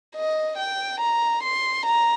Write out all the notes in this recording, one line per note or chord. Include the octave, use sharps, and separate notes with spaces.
D#5
G5
A#5
C6
A#5